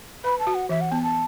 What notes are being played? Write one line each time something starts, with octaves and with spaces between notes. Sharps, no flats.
B4 B5
A5
F#4
F#5
E3 E5
F#5
B3 A5
A5